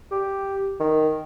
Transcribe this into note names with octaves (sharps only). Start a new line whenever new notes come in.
G4
D#3